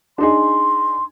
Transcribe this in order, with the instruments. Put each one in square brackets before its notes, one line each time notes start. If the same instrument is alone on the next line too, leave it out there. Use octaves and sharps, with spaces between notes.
[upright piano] D4 D#4 G#4 [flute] C6